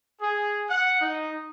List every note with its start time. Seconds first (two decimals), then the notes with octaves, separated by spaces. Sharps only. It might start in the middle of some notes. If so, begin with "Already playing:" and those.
0.21 G#4
0.69 F#5
1.00 D#4